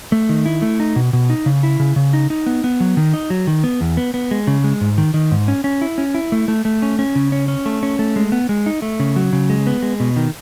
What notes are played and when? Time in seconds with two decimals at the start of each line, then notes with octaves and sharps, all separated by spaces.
0.12 A3
0.29 D#3
0.46 E4
0.62 A3
0.80 D#4
0.96 B2
1.13 B2
1.30 D#4
1.46 C#3
1.63 E4
1.80 C#3
1.96 C#3
2.13 D#4
2.30 D#4
2.46 B3
2.64 B3
2.80 F#3
2.97 D#3
3.14 D#4
3.30 F#3
3.47 D#3
3.64 B3
3.81 E2
3.97 B3
4.14 B3
4.31 G#3
4.47 C#3
4.64 G#3
4.81 G#2
4.98 D#3
5.14 D#3
5.32 G#2
5.48 C#4
5.64 C#4
5.81 E4
5.98 C#4
6.14 E4
6.32 A3
6.48 A3
6.65 A3
6.82 C#4
6.99 C#4
7.15 C#3
7.32 C#4
7.48 C#4
7.66 A3
7.83 C#4
7.99 A3
8.16 G#3
8.32 B3
8.49 G#3
8.66 D#4
8.82 A3
9.00 C#3
9.16 F#3
9.33 C#3
9.50 G#3
9.67 B3
9.83 G#3
10.00 B2
10.16 D#3